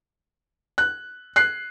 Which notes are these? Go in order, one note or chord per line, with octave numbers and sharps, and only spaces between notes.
F#6
F#6 C7